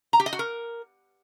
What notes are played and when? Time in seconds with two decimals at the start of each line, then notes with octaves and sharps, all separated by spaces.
0.13 A#5
0.20 G4
0.26 D#5
0.33 F#4
0.39 A#4